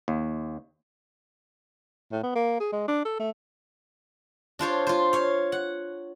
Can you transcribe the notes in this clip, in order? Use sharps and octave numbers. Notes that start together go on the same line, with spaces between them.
D#2
A2
B3
A#3
G#4
G#3
D4
A4
A3
D4 F4 C5 C#5
F4 C5
C#5 F5
F#5